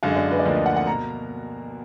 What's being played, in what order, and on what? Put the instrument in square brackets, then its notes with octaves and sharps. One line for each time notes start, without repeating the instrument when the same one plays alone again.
[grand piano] F#2 D3 G#3 [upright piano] F5
[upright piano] D#5
D5
B4
D5
[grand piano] D2 D3 F3 A#3 [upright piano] D#5
[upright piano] D#5
F#5
F#5
[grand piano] B2 A#3 [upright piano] A#5